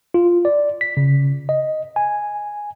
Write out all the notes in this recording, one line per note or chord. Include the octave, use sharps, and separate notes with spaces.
F4
D5
B6
C#3
D#5
G#5